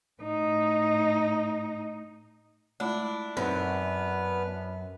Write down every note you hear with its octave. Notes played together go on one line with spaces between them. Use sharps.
A2 D#4
G#3 A3 D4 E4 F4
F#2 B3 C4 D#4 B4 F6